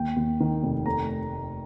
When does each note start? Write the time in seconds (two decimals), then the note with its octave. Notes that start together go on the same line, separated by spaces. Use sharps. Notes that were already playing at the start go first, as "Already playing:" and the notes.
Already playing: D#2 G5
0.16 D#2
0.40 D#3
0.63 F1
0.86 A3 A#5